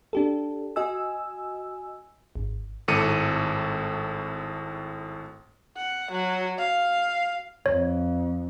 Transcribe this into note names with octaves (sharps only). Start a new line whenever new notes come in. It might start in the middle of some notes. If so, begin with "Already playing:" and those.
D4 G4 A4
F#4 D#5 G#5 E6
G#1
G#1 A2 A4 D6 C#7 D#7
F#5
F#3
F5
F2 C#5